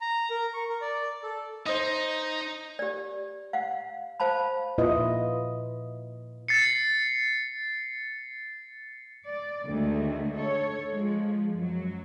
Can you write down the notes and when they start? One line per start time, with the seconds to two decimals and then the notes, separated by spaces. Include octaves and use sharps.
0.01 A#5
0.30 A#4
0.54 C#6
0.69 A#4
0.81 D5
1.23 A4
1.66 D#4 C5 D#5
2.79 G4 D5
3.53 F5 F#5
4.20 C5 F5 A5 B5
4.78 A#2 E4 F4 B4 D#5
6.48 A6 C7 C#7
9.26 D5
9.67 D2 D#3 G#3 A3
10.35 A4 C#5
10.90 F3 G#3
11.55 F#2 F#3